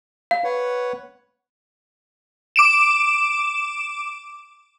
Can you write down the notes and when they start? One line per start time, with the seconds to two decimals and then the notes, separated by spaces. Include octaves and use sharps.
0.31 F5
0.44 B4 C#5 F#5
2.56 D6 D7 E7